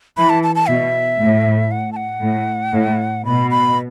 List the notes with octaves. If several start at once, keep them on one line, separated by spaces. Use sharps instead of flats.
E3 B5
A5
A5
A5
B2 E5
A2
F#5
A5
F#5
A2
A2
B2 B5
B5